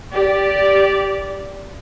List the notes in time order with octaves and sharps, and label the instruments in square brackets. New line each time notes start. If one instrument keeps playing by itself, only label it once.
[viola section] G4 D5